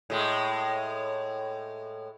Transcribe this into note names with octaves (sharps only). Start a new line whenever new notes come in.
A2 G#3